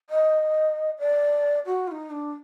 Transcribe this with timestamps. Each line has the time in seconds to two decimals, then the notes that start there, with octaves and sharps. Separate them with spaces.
0.10 D#5
0.99 D5
1.66 F#4
1.87 F4
1.92 D#4
2.11 D4